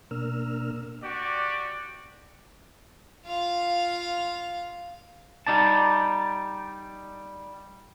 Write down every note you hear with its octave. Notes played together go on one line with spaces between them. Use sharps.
B2 A#3 D4 A#4 E6 F6
F#4 G4 D5
F4 F5
G3 D#4 D5 A5